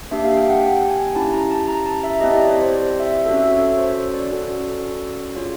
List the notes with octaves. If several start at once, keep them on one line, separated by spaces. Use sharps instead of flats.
A#3 D4 G4 E5
F5
G5
F#5
G5
G#5
C#4 E4 G4 A5
A#5
A5
A#5
A5
E5
C4 E4 G4 D#5
D5
C#5
C5
D5
E5
C#4 F#4 A4 E5
E5
C#5
C#5
C5
C#5
D5
C#4 F#4 A4
C#4 F4 G#4 C#5